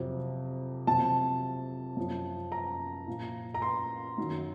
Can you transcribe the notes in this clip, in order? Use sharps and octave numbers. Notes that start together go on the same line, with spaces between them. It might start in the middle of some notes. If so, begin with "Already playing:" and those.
Already playing: F2 C3 F#3
F2 C3 F#3 A5
F#2 F3
A#5
A#2 F3
A#5
C6
F#2 D#3 F#3